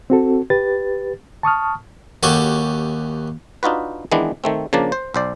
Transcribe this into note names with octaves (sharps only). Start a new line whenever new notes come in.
C4 F#4 A4
G4 B4 A6
A5 C#6 D#6 F6
D#2 C#4 F#4 G4 A4 C#6
D4 D#4 F4 F#4 B4
D#3 E3 G#3 B3 D4
D#3 A3 C4
C#3 F3 A#3 D4 A5
C5
B1 C5 D5